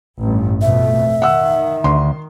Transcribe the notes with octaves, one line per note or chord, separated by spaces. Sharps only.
A1 G2
F2 B2 A3 E5
D#3 F#5 E6
D2 C6